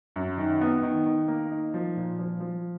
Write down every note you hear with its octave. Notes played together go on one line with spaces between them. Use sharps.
F#2
D#3
B3
D#3
D#3
A#3
D#4
F3
A#2
F3
F3